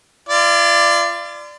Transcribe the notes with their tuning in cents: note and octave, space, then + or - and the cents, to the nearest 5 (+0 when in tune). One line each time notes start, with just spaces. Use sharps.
F4 -35 D5 +10